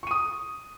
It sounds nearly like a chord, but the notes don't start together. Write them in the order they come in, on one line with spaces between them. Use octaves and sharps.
C#6 D#7 D#6